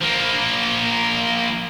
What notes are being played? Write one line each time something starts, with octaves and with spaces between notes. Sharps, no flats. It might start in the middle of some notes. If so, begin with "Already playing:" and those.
F3 A#3